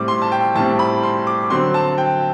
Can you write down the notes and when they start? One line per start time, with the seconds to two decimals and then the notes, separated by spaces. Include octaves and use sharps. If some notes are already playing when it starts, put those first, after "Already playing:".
Already playing: A2 G3 C4 D6
0.08 C6
0.22 A5
0.32 G5
0.55 A2 G3 C4 A5
0.79 B5
1.03 C6
1.27 D6
1.50 D3 F#3 C4 C6
1.74 A5
1.98 G5